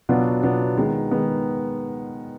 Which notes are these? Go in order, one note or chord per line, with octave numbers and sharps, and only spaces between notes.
B2 F#3 B3 D4 F4
B2 F#3 B3 D4 F4
D#3 G#3 B3
D#3 G#3 B3